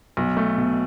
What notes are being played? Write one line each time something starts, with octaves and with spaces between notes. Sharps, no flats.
B1
A3
B2